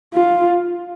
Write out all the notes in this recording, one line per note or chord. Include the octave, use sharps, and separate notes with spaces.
F4